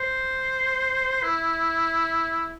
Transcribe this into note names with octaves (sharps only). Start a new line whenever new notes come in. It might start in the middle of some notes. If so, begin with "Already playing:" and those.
Already playing: C5
E4